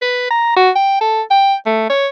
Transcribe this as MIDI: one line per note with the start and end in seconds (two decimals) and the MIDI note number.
0.02 0.26 71
0.31 0.52 82
0.56 0.70 66
0.75 1.00 79
1.01 1.22 69
1.31 1.55 79
1.66 1.86 57
1.90 2.08 73